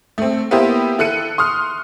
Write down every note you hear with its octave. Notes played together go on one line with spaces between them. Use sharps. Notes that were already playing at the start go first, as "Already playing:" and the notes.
A3 C4
A#3 B3 E4 G4 C5
E4 A4 F#6 C#7 D#7
C6 D#6 F6